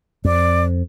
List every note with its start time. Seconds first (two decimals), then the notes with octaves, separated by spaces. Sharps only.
0.25 F2 D5